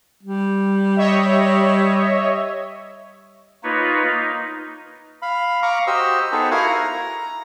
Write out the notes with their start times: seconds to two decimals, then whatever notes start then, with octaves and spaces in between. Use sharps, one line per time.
0.23 G3
0.97 C#5 D#5 E5
3.64 A#3 D#4 F4 B4 C#5
4.05 D#4
5.22 F5 B5
5.62 F5 A#5 C#6 D6
5.87 F#4 G4 C5 D#5 E6
6.32 B3 D#4 G#4 A4 B4 C5
6.51 E4 F#4 A#4 F5 F#5 G#5
6.66 A#5